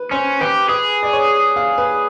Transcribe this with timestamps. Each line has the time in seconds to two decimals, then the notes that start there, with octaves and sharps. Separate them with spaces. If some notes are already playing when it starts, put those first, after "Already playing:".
Already playing: B4
0.11 C#4 C5
0.41 G4 B4
0.69 G#4 B4
1.03 D5
1.13 C#5
1.56 F5
1.78 B4